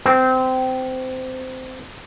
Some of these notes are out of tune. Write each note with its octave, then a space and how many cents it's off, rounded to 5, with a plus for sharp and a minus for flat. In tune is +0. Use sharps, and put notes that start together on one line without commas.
C4 -20